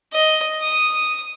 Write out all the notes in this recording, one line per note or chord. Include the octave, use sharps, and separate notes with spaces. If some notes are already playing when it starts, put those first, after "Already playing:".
D#5
D#6